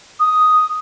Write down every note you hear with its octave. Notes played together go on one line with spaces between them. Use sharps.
D#6